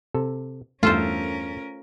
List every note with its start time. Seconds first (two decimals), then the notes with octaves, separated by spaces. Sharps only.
0.14 C3 A4
0.83 E2 G2 A3 C#4 F4 A4 A#4 C5